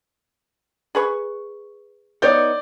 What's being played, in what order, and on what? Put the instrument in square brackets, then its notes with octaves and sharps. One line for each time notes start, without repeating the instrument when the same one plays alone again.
[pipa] G#4 B4 C#6
[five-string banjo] B3 D#4 C#5 [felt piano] D5 G6